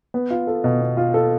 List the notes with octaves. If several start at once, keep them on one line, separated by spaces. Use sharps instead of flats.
B3
F4
A4
B2
B3
F4
A4